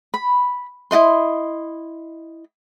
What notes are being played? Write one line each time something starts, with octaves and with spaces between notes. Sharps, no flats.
B5
E4 F#4 D#5 C6